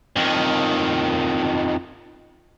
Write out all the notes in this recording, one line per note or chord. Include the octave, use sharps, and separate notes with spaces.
F2 D#3